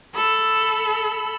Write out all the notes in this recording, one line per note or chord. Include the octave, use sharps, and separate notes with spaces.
A4 B5